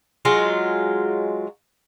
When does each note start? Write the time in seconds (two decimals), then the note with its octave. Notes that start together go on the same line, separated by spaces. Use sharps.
0.25 F#3 G#3 F4